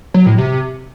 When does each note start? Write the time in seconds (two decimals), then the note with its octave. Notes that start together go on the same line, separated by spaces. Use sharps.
0.14 F#3
0.26 A2
0.38 C3